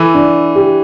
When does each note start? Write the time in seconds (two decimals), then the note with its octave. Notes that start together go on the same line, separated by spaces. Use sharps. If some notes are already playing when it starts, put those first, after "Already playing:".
Already playing: E3 A4
0.14 D4
0.55 G4